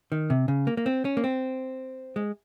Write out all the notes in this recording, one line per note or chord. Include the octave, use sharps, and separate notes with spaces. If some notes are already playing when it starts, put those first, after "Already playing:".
D#3
C3
C#3
A#3
A#3
C4
C#4
A#3
C4
G#3